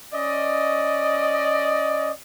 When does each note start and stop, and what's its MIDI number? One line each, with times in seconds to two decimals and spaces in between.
0.13 2.10 61
0.13 2.10 74
0.13 2.10 75